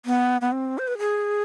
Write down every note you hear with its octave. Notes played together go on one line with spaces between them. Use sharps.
B3
B3
C4
C5
B4
G#4